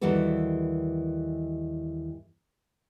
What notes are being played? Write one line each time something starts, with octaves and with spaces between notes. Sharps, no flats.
D#2 E3 G3 F#4 A4 B4